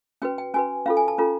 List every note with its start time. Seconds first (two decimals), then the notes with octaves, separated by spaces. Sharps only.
0.22 C#4 F#4 B4 G5
0.38 G5
0.54 C#4 F#4 B4 G#5
0.86 C#4 F4 A4 F5
0.97 G#5
1.08 A5
1.18 C#4 F4 A4 A#5